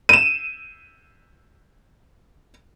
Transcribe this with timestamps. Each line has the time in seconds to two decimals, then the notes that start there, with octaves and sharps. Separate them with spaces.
0.09 D#7 E7